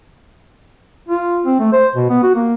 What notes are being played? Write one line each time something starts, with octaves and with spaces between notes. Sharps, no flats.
F4
C4
A3
C5
B2
B3
F#4
A#3